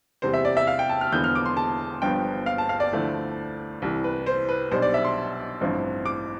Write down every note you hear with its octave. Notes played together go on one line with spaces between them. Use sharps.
E2 C3 G3 C5
E5
D5
E5
F5
G5
A5
F6
E1 E2 D3 F3 B3 G6
F6
D6
C6
A5
G1 G2 F3 B3 G5
F5
A5
F5
D5
D2 D3 F3 A3 E4
C2 C3 E3
B4
C5
B4
B1 B2 G3 D4 C5
D5
E5
C6
A1 G2 F3 C4 E4
D6